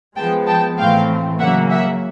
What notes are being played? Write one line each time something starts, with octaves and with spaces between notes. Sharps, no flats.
F3 G#3 B3 G5 A5
G5 A5
A2 E3 A3 C4 F5 G5
C#3 F#3 A#3 E5 F#5
E5 F#5